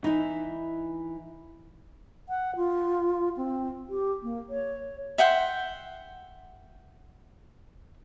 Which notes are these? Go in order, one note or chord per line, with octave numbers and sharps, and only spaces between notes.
E3 D#4 E4
F#5
F4
C4
G4
A#3
C#5
E5 F#5 G5 C6